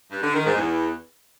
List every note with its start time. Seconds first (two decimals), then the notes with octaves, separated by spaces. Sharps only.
0.11 G2
0.22 D3
0.34 D#3
0.45 G#2
0.56 E2